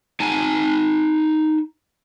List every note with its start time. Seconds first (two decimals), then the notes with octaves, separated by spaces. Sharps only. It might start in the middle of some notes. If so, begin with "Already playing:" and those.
0.20 D#4 G#5 A5